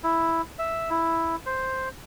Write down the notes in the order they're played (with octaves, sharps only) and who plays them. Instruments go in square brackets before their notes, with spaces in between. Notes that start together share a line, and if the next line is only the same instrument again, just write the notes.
[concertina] E4
E5
E4
C5